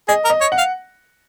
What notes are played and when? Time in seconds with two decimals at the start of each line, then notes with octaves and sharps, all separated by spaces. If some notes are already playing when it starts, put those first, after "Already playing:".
0.08 G#4 D#5
0.25 A#4
0.30 D#5
0.41 C#5
0.52 F#5
0.58 F5